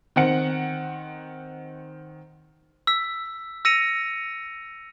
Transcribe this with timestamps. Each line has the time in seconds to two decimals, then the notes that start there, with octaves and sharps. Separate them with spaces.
0.16 D#3 C4 F#5 C#7
2.87 E6 B6
3.65 E6 A#6 C#7 D#7 F7